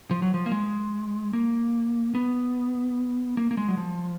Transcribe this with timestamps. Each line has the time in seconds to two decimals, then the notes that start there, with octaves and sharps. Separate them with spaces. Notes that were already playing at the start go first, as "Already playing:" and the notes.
0.11 F3
0.22 F#3
0.34 F3
0.46 A#3
0.52 G#3
1.33 A#3
2.15 B3
3.37 A#3
3.51 A#3
3.57 G#3
3.68 F#3
3.77 F3